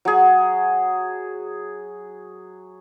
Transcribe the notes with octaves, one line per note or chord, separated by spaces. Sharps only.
F#3 G#4